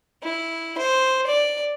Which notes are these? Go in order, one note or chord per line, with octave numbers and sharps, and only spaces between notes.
E4
C5
D5